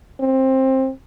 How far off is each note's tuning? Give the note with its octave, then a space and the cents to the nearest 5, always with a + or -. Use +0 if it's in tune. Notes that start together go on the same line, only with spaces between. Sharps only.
C4 +15